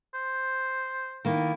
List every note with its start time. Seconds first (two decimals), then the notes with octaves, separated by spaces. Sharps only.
0.14 C5
1.25 D#3 A#3 E4